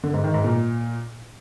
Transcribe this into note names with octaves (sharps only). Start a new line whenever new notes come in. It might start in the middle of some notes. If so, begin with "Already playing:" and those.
D3
G#2
D#3
G#2
A#2